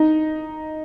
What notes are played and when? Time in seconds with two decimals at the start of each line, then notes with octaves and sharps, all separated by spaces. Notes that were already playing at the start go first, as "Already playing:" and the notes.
Already playing: D#4